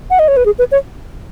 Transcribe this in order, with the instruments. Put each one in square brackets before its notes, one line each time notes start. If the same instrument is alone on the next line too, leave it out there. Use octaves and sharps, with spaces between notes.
[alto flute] F#5
D#5
C#5
B4
G#4
B4
C#5